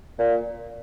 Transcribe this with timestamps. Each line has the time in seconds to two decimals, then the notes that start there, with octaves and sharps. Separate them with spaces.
0.19 A#2